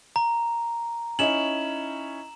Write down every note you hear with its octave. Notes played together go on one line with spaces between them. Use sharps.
A#5
C#4 D#4 E4 E7 F#7